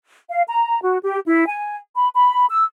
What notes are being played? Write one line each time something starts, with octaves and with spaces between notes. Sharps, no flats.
F5
A#5
F#4
G4
E4
G#5
B5
B5
E6